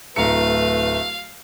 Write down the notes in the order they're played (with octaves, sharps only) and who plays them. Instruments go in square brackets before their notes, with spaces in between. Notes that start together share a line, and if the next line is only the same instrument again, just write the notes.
[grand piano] D1 A#5 C#7 [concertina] A3 [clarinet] B4 [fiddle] F5